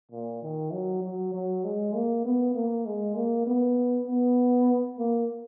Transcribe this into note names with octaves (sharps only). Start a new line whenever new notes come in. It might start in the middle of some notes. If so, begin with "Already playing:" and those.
A#2
D#3
F#3
F#3
F#3
G#3
A#3
B3
A#3
G#3
A#3
B3
B3
A#3